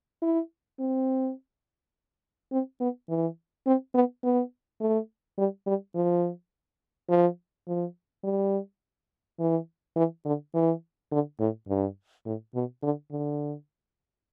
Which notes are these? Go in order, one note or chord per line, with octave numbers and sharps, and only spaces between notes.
E4
C4
C4
B3
E3
C4
B3
B3
A3
G3
G3
F3
F3
F3
G3
E3
E3
D3
E3
D3
A2
G2
A2
B2
D3
D3